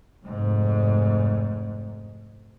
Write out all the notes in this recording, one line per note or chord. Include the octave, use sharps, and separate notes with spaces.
F1 G#2